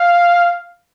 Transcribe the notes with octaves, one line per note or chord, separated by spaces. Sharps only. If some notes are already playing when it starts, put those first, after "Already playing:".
Already playing: F5